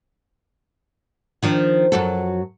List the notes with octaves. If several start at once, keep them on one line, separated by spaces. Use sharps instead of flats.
D#3 F3 D4
F#2 F#3 A4